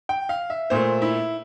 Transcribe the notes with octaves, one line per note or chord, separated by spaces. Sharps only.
G5
F5
E5
A#2 A3 C5
E4